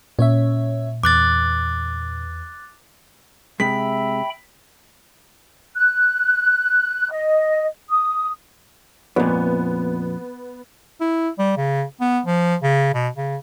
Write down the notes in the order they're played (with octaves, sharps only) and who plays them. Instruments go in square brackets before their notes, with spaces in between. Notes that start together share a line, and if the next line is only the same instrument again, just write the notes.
[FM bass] A#2 [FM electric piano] C#4 C#5 E5
[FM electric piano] E2 [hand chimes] D6 F#6 A6
[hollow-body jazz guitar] C3 G#3 [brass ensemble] E5 [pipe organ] G5 B5 [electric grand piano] B6
[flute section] F#6
D#5
D#6
[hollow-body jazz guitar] F2 A#2 [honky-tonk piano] B3
[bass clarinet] E4
G3
C#3
B3
F3
C#3
B2
C#3